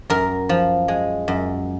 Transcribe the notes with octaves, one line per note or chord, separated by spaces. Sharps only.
F#2 A#4
F3
G#3
F#2